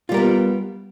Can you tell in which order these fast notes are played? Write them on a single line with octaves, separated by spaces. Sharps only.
F4 G3 A#4 B3